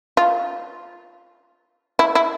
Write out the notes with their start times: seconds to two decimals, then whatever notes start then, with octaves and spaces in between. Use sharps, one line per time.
0.17 F4
1.99 E4
2.15 E4